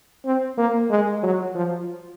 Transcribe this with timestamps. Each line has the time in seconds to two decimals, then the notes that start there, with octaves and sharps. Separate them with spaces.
0.26 C4
0.58 A#3
0.90 G#3
1.23 F#3
1.55 F3